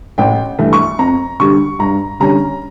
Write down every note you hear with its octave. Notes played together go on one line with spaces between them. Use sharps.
A1 G5
G2 E3 A3
C#6
F2 A#5
D3 G3 D4 C#6
G2 A#5
D3 G3 C#4 A#5